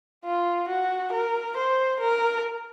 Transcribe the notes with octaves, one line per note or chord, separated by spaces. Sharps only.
F4
F#4
A#4
C5
A#4